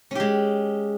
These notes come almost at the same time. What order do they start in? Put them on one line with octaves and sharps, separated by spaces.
C#4 G4 G#3